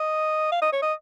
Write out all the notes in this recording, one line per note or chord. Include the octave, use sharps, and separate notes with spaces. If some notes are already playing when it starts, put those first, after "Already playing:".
Already playing: D#5
F5
D#5
C#5
D#5